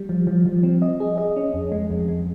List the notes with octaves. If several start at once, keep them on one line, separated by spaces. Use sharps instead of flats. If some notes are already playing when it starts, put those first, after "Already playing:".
Already playing: G3
F3
F3
F3
C4
D#5
G#4
D#5
C#4
F2
G#3
F2
G#3